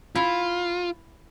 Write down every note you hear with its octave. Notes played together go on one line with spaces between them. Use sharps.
E4 F4